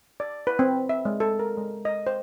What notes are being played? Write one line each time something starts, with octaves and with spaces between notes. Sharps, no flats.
D5
B4
C4
E5
G#3
A4
A#4
G#3
D#5
C5